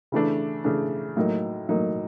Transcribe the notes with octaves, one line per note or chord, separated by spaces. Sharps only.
C#3 E3 A3 D4
C#3 E3 A3 D4
A2 F#3 A#3 D#4
A2 F#3 A#3 D#4